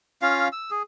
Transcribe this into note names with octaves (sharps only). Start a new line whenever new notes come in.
C#4 F4 F5
E6
G#4